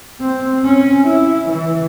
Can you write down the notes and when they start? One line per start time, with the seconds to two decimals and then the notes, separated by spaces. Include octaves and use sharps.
0.20 C4
0.65 C#4
1.07 E4
1.49 E3